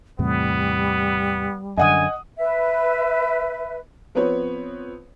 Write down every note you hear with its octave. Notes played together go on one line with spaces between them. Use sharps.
E2 A2 C3 G3 B3
F#2 D3 D#5 F#5 G#5 D#6
B4 E5
F3 B3 C4 B4 C#5